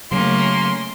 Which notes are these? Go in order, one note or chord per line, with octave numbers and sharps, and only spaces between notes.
C#3 F#3 A3 A#3 C#4 C6